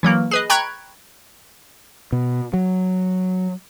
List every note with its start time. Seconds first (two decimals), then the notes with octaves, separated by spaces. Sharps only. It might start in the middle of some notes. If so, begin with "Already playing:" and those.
0.03 E3 F#3 A#3
0.31 G#4 B4 D#5
0.50 G5 A#5 B5 C#6 F#6 G#6
2.12 B2
2.54 F#3